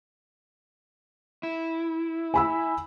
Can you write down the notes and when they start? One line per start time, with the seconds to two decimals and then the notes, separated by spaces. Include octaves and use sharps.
1.43 E4
2.34 G#5 B5 E6